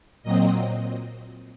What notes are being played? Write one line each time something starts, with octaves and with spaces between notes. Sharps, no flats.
A#2 F#3 C4 D#5